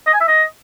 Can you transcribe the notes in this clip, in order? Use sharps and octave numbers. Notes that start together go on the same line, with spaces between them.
D#5
G#5
E5
D#5